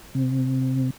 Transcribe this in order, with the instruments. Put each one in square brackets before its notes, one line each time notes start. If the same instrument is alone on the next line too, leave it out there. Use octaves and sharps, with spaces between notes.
[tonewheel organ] C3